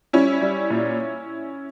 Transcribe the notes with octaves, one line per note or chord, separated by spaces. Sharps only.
G3 C#4 E4
G3
A#2